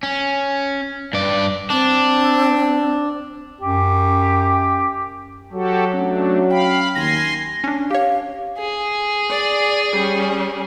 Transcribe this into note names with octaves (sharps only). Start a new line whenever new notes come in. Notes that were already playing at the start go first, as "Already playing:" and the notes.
C#4
G2 D5
C4 D4
F#2 G4
F#3 F#4 G4 A4
A3 C#4 D4
F5 G5 B5
D#2 G#5 C6 A#6
C#4 D4
G4 C#5 F5
G#4
D5
G3 C#4